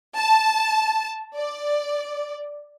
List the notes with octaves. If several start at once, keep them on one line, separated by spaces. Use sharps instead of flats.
A5
D5